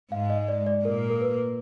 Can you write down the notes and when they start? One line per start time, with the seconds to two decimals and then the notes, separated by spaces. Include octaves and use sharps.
0.12 G#2 G#3 F5
0.30 D#5
0.48 D5
0.66 D5
0.84 A#2 A#3 A#4
1.10 A#4
1.21 B4